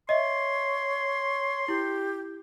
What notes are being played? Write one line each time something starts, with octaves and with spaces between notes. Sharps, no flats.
C#5 D#5 E5 C6
E4 G4